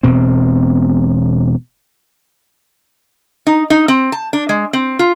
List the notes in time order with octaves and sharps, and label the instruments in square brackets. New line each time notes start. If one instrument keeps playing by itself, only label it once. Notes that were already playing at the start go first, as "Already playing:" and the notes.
[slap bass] E1 B2 C4
[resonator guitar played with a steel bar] D#4
D#4
C4
A5
D4
G#3
C4
F4